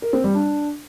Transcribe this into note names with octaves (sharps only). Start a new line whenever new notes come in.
A#4
C4
G3
D4